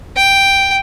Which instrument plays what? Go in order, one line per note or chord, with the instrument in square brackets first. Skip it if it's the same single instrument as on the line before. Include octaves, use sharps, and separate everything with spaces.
[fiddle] G5